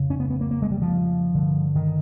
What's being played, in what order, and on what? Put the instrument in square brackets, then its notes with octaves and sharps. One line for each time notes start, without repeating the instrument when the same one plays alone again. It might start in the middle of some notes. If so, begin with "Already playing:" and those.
Already playing: [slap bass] F2 C#3
C#4
B3
B3
A#3
A#3
G#3
G3
F3
G2 D3
D#3